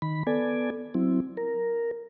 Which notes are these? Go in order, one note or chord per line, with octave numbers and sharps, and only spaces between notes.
D#3 B5
B3 A4 D5 G#5
F#3 C4 E4
A#4